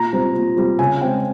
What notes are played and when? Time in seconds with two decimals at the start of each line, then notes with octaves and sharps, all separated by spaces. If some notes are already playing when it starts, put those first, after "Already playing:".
Already playing: A#2 A#5
0.13 G3 C4
0.35 A#2
0.56 G3 C4
0.79 C#3 G#5
1.01 G#3 C4 G5